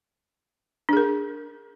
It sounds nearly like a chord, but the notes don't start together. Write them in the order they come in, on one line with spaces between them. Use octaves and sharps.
D4 G#4 A#4